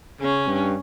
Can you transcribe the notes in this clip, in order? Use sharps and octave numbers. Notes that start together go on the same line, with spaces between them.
C#3 C#4
G2